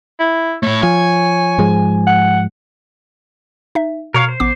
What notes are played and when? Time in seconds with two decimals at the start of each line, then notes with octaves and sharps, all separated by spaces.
0.20 E4
0.63 A3 E4 C#5
0.83 F3 G#5
1.58 G#2 F3 G#3
2.07 F#5
3.75 D#4 E5
4.14 B2 A#4 C#5 F5 C#7
4.29 C5
4.40 A1 B3 D6